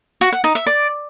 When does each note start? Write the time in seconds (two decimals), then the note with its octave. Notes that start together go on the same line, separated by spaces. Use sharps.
0.21 F#4
0.32 F#5
0.44 D#4
0.55 E5
0.66 D5